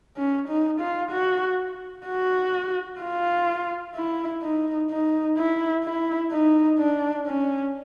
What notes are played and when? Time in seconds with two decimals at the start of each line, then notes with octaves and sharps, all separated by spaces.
0.17 C#4
0.48 D#4
0.80 F4
1.11 F#4
2.06 F#4
3.01 F4
3.96 E4
4.42 D#4
4.90 D#4
5.37 E4
5.84 E4
6.31 D#4
6.79 D4
7.26 C#4